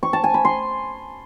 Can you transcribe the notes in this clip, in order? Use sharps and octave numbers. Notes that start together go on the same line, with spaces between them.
C#6
A5
G#5
B5
C6